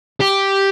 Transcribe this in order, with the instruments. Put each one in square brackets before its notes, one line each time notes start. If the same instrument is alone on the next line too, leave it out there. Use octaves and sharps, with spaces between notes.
[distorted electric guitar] G4